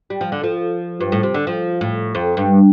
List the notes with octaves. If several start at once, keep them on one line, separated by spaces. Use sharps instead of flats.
G3
F3
D3
F3
G2
A2
C3
D3
F3
A2
F2
G2